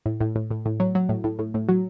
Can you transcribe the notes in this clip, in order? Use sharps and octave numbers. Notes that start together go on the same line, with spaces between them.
A2
A2
A2
A2
A2
F#3
F#3
A2
A2
A2
A2
F#3